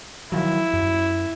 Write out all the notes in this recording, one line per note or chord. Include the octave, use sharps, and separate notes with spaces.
D#3 F3 F#3 E4
F#2